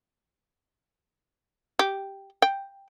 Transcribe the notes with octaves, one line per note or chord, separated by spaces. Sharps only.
G4
G5